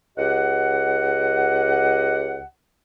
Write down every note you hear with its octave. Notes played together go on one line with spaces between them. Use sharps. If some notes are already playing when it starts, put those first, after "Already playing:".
C#2 G4 D#5 F#5